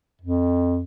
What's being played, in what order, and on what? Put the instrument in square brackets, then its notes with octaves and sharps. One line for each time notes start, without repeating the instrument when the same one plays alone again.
[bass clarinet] F2